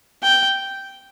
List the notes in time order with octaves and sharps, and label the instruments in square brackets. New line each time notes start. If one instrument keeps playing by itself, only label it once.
[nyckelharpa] G5